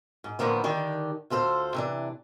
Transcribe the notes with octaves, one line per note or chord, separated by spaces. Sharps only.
G#2
A2 D3 F3 A#3 B3
D3 D#3 D4 G4
D2 F4 A4 B4 C5
C3 E3 D4